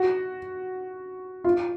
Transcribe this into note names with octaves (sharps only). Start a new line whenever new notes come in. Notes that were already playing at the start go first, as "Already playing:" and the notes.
Already playing: F#4
F4